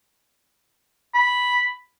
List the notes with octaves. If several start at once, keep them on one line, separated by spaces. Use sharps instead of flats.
B5